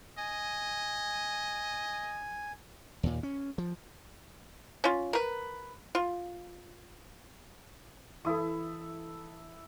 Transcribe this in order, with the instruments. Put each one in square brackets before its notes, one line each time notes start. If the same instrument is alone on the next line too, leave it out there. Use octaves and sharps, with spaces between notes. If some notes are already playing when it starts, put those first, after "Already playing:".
[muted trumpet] D#5 [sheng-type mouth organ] G#5
[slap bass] D#2 A#2
C#4
F3
[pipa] C#4 F4
A#4 B4
F4
[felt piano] E3 A4 [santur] E4 D#6